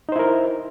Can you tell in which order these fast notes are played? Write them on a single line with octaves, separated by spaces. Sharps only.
D#4 C5 E4 A#4